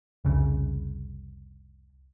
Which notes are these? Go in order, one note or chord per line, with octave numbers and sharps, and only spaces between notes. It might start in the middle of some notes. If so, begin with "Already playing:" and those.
F1 C2 C#3